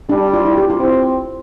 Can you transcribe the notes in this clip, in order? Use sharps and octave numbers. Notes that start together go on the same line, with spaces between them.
G3 D4
F4
E4
G4
F4
C4 E4